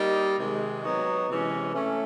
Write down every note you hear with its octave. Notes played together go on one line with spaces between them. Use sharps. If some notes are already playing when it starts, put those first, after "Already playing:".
Already playing: G3 A#3 D#4
C3 D#3 G#3
F#3 B3 D#4 F#4
C3 E3 G#3 C#4
A3 C#4